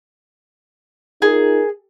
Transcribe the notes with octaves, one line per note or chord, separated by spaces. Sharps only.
D#4 F4 G#4 A#4